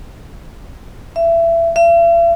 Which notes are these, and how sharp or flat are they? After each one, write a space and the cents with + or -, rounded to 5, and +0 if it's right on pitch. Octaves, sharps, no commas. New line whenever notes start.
E5 +25
E5 +45